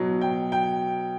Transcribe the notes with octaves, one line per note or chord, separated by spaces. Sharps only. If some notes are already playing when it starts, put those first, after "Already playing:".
Already playing: B2 F#3
G5
G5